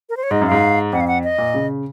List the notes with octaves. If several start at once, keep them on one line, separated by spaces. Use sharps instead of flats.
A#4
C5
C#5
G#2 D#5
F#2
G#2 F5
F2 F#5
F5
F#5
D#5
A#2
C#3